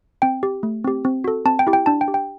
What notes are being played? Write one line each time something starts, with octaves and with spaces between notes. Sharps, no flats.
C4 G5
G4
A3
C4 G4
C4
F#4 A4
C4 A5
G5
E4 G4
G5
D4 A5
G5
G4
G5